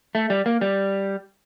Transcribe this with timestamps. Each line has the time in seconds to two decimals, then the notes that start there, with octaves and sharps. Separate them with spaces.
0.15 A3
0.30 G3
0.46 A#3
0.61 G3